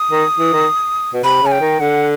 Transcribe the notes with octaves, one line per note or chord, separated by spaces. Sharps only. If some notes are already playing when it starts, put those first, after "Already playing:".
Already playing: D#6
D#3
E3
D#3
B2
C3 B5
C#3 G#5
G5
D#3
D3 F#5